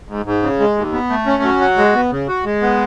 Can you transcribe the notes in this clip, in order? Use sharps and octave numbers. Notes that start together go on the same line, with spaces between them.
G#2
G#2
C#3
G#3
D#2
B3
A3
C#4
F#3
F#4
G#3
B3
C#3
F#4
G#3
B3